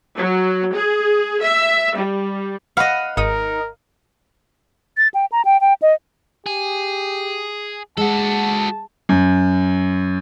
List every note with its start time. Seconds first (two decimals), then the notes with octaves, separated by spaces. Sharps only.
0.15 F#3
0.73 G#4
1.41 E5
1.96 G3
2.77 D#5 F5 F#5 B5
3.17 G#1 G#2 D#4 A#4 D#6
4.97 A6
5.14 G5
5.32 A#5
5.45 G5
5.61 G5
5.82 D#5
6.46 G4 G#4
7.97 G#3 F#4 A4 A5
9.09 F#2